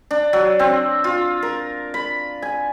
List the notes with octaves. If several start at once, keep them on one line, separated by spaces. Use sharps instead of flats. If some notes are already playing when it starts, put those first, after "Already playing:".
D4
F#3
C4
F4
A#4
B5
G#5